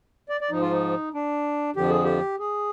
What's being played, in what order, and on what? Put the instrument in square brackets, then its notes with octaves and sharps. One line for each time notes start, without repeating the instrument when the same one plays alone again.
[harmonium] D5
D5
G#2 F3 D#4
F4
D#4
D4
F2 D3 F3 G4
G#4
G4
G#4